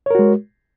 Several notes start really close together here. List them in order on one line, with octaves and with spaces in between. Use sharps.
C#5 A#4 F#4 G#3